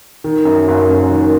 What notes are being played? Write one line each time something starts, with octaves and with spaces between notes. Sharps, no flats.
D#3
F#2
F#1
F#1
D#3